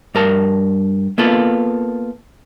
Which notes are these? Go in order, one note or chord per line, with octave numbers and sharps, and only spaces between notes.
G2 A#4 A5
A#3 B3 F4 A4